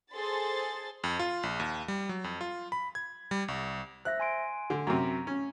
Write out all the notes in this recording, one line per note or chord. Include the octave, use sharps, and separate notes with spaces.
G#4 A4 C5 C6 A6
F2
F4
A#1
D#2
G3
F#3
F2
F4
B5
G#6
G3
C2
C5 E5 F#6 A#6
G#5 C6 D7
D3
F#2 C3 A#5
C#4